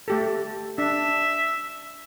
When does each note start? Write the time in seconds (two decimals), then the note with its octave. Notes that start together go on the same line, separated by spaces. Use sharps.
0.08 A3 G4 A4
0.78 D4 E5